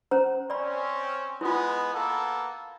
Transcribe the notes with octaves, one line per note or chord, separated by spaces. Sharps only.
C#4 C5 A#5
C4 C#4 D5 B5
G#3 B3 E4 F4
A#3 B3 A4